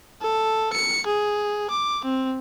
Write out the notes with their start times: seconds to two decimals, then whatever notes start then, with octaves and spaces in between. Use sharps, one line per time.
0.22 A4
0.73 C#7
1.07 G#4
1.70 D6
2.05 C4